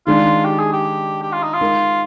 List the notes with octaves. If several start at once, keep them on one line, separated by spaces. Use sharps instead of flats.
D#3 G#3 D4 F4
G4
G#4
G4
G4
F4
D#4
F4
G#3 D#4 A#4